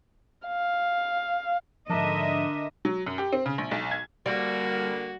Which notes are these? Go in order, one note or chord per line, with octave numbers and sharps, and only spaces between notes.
F5
G#2 D3 F3 D4 A#4 D#5 E5
F#3
F#2
G4
C4
C#3
A#1
B1
G#6
D3 G3 A#3 F#4